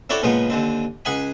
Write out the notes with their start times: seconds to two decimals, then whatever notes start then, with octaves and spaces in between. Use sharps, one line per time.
0.10 C4 E4 F#4 A4 C#5 D5
0.23 A#2 C#3 F3 G#3 B3
0.50 D#2 D3 C4
1.05 C#2 G#4 F#5 G#5 B5